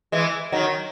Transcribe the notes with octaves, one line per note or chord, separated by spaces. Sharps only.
E3 G#3
D#3 F#3